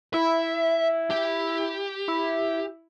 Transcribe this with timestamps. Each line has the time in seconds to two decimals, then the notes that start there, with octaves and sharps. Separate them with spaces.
0.14 E4 E5
1.11 G4
2.08 E4